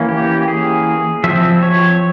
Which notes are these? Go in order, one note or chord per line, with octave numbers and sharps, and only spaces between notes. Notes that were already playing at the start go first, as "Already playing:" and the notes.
Already playing: E3 A#3 C#4
G4
G#4
F3 C4 E5
C#5